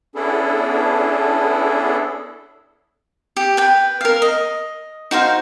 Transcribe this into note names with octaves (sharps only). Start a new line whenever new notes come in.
B3 C#4 D4 E4 G#4 A4
G4
B4 G5
A#4 F5
D#5
D#4 F#4 C5 F5